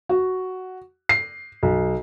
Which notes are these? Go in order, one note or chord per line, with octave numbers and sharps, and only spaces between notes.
F#4
C7
B1